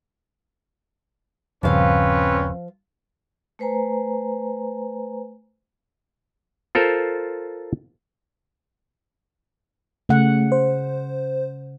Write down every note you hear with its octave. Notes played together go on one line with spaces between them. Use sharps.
D#1 G2 C#3 F3 C4 C#4 B4 F5
A3 B4 C5 G#5 A#5
F4 A4 A#4 C5
C#3 A3 F#5
C5